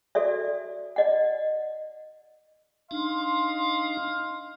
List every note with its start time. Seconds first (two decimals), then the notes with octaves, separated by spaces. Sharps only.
0.15 F#4 A4 D5 E5
0.96 D5 D#5 F#5
2.91 D4 D#4 D#5 F5 C6